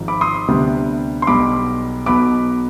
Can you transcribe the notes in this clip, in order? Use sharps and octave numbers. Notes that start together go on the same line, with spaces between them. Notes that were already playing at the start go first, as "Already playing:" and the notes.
Already playing: G#1 G#2 F3
B5 D6
C6 D#6
D2 C3 G3 B3 D4
C6
B1 B2 G3 B5 D6
B1 B2 B3 B5 D6